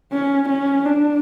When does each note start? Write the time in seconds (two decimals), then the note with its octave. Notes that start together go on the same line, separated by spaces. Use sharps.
0.13 C#4
0.49 C#4
0.85 D4